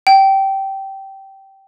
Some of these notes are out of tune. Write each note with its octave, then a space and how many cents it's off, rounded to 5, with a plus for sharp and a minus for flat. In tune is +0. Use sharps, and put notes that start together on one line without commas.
G5 -15